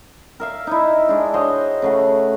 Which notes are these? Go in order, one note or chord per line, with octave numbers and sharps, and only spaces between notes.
A#4 E5 F5
D#4 E4
G#3 D4
F#4 C5 C#5 D#5
C#3 A3 F#4